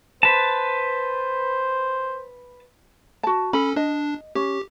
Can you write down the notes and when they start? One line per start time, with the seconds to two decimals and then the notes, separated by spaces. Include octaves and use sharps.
0.23 B4 C5 A5
3.23 F#4 A5
3.53 C#4 A4 B5
3.76 D4 D#5
4.35 C#4 G4